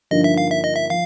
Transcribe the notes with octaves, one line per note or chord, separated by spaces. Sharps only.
G2 D3 F3 A#3 D#4 D#5
E5
F5
E5
D#5
E5
F3 F5